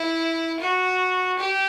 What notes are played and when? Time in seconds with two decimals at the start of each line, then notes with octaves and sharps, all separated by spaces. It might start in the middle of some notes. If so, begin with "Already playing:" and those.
Already playing: E4
0.59 F#4
1.39 G4